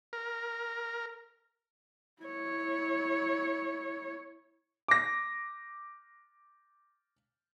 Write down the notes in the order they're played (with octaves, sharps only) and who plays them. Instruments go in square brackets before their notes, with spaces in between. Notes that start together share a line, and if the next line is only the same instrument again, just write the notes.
[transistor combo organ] A#4
[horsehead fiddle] E4 C#5
[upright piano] D6 A#6